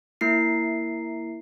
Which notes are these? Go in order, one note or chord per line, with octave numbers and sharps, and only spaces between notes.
A#3 E4 C7